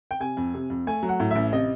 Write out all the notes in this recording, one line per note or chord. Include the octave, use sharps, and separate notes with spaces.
G5
C3 G#5
F2
C3
F2
A3 G#5
F#3
F#5
A2
E5
A1
C3 D#5